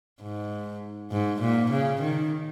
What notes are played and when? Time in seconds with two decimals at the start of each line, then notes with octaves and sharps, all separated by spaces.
0.22 G#2
1.11 G#2
1.41 A#2
1.71 C#3
2.01 D#3